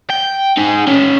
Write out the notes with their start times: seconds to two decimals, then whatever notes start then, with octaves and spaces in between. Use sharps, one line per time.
0.10 G5
0.57 D#4 G#4
0.88 C#4 A4